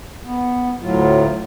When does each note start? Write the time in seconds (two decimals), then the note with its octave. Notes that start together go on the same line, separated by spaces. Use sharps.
0.25 B3
0.81 D2 A2 F#3 F4